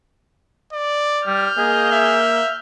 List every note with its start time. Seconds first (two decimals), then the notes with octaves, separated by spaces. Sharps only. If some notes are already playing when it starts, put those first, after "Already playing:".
0.73 D5
1.27 G3 F6 G6
1.58 A#3 G#4 D#5
1.92 E5